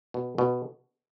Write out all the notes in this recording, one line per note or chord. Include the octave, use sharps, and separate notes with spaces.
B2
B2